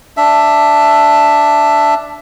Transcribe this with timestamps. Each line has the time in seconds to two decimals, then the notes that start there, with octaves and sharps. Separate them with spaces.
0.17 D4 E5